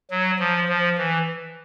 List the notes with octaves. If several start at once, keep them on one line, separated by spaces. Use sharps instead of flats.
F#3
F3
F3
E3